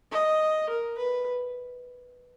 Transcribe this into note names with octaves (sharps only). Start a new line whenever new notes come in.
D#5
A#4
B4